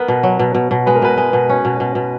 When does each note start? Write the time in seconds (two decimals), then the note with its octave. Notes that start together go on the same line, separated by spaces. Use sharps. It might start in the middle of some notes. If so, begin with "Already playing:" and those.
Already playing: B3 A#4 B4
0.08 B2
0.23 F#3
0.39 B2
0.55 B2
0.71 B2
0.86 G#3 B4
0.95 A#4
1.02 B2 B4
1.18 G#3
1.33 B2
1.50 C#4
1.65 B2
1.80 B2
1.95 B2